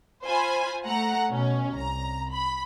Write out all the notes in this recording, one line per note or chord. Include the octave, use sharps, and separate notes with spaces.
F4 C5 G#5 B5
A3 F#5 A#5
B2 C#4
C2 A#5
B5